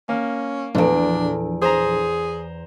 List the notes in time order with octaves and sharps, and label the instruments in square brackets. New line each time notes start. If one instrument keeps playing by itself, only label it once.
[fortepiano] A#3 [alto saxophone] C#4
[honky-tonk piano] A#1 A4 D7 [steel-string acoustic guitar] E2 G2 [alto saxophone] D4
[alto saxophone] G#4 [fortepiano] C5 A#5